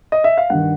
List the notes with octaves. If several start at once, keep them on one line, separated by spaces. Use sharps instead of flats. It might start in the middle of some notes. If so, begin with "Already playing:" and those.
D#5
E5
F5
G2 D#3 F#5